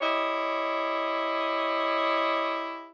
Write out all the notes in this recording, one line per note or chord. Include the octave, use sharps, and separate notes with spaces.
E4 G4 C#5 D#5